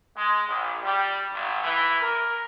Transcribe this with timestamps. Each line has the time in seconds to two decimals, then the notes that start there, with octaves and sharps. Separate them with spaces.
0.16 G#3
0.48 A#1
0.83 G3
1.32 G#1
1.62 E3
2.00 A#4